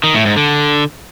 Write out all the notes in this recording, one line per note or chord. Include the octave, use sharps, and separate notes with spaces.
D#3
A2
G#2
D3